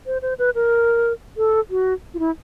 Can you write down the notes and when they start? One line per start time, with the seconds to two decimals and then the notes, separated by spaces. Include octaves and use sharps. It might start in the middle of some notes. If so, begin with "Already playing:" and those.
0.06 C5
0.22 C5
0.39 B4
0.55 A#4
1.37 A4
1.70 F#4
2.14 F4
2.19 E4